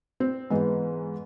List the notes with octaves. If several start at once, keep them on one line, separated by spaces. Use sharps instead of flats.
C4
G#2 E3 G#3 B3